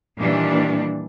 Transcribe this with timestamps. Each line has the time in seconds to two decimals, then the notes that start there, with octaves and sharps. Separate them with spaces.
0.17 A#2 D#3 E3 G3 D4